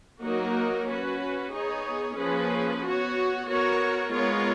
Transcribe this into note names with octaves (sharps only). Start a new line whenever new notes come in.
F#3 A#3 D#4 F#4 A#4
C#4 F#4 B4
B3 D#4 G#4 C#5
F3 A#3 C#4 G#4 B4
B3 F#4 C#5
B3 F#4 A#4 C#5
G#3 B3 F4 A#4 C#5